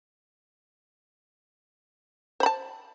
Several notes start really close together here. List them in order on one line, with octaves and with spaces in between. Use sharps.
C5 B5 A5